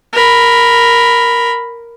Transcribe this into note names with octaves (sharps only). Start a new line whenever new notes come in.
A#4 B5